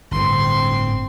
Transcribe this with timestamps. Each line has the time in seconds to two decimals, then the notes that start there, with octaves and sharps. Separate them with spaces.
0.11 G1 A2 D3 C4 C6